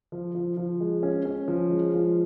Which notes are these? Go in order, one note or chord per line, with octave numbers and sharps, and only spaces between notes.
F3
F3
F3
G#3
C#4
C#4
F3
G#3
F3